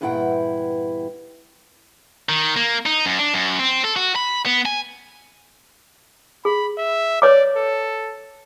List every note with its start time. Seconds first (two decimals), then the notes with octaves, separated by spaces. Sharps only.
0.01 E2 G2 A#2 E4 F#5 G5
2.29 D#3
2.56 A#3
2.86 D#4
3.06 F#2
3.19 D4
3.34 F#2
3.59 C4
3.84 A4
3.96 F#4
4.16 B5
4.46 B3
4.65 G#5
6.45 G#4 B5
6.78 E5
7.22 B4 C#5 D5 D6
7.56 A4